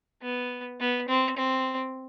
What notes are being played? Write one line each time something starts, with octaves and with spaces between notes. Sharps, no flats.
B3
B3
C4
C4